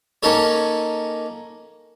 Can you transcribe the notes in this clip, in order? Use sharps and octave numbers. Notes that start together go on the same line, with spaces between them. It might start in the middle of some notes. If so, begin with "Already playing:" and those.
A#3 C#4 D#4 A4 C#5